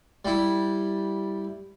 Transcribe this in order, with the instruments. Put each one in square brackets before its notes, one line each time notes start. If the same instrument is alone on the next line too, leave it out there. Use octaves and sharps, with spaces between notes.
[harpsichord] G3 E4